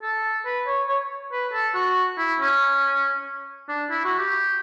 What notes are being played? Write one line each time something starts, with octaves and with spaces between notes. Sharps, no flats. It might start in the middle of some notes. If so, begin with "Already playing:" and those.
A4
B4
C#5
C#5
B4
A4
F#4
E4
C#4
D4
E4
F#4
G4